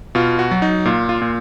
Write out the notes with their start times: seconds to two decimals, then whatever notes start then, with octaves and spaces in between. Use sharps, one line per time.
0.15 B2 F4
0.39 F#4
0.51 F#3
0.62 D#4
0.85 A#2 F4
1.09 F4
1.22 A#2